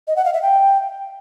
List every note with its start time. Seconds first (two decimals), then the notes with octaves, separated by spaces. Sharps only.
0.08 D#5
0.16 F#5
0.25 F5
0.34 E5
0.42 G5